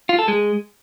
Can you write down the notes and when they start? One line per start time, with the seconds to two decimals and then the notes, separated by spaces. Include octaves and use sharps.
0.09 F4
0.19 A4
0.28 G#3